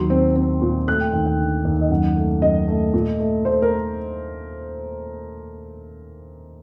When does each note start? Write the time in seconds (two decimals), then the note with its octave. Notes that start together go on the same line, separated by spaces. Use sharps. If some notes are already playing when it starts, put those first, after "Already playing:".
Already playing: D#2 F#3 C6
0.10 C4
0.36 C4
0.62 A#2
0.87 A3 F#6
1.00 G5
1.13 D#2 G5
1.26 G5
1.39 D3
1.65 D#2
1.81 D#5
1.90 F#2 F#5
2.16 A3
2.42 F#2 D#5
2.68 A3
2.94 A#2
3.20 A3
3.45 A3 C5
3.62 A#4